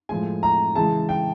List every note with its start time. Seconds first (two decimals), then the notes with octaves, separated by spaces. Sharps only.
0.09 A2 F3 G#3 G#5
0.43 A#5
0.75 C#3 E3 G#3 A5
1.09 G5